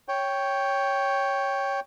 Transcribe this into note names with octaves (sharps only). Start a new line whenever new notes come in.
C#5 G5